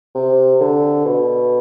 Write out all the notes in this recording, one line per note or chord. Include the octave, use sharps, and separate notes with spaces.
C3
D3
B2